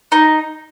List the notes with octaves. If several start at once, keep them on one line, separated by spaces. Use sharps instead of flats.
D#4